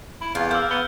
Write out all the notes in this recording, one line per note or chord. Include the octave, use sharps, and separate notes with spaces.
E4
E2 F4
A#3 E6 F6 G6
B3 G7